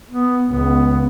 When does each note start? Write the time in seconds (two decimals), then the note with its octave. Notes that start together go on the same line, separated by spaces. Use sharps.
0.10 B3
0.49 C#2 B3